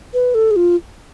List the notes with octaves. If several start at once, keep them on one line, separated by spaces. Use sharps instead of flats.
B4
A4
G#4
F4